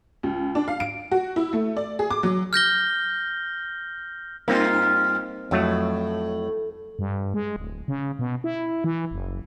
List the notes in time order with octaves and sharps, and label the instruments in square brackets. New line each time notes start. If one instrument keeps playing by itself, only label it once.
[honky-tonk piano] C#2
D4
F5
D7
F#4
E4
A3
D5
G#4
D6
F#3
[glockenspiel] F6 G6 A#6 G7
[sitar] G2 F4 [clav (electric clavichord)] A#3 C4 D#4
[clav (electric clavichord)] F2 F#3 A3 [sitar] A2
[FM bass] G2
G#3
D1
C#3
B2
E4
E3
F#1